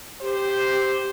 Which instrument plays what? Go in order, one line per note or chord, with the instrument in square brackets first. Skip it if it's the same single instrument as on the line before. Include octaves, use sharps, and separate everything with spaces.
[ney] G4 [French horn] C5